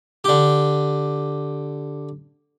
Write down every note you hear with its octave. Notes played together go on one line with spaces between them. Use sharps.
D3 G4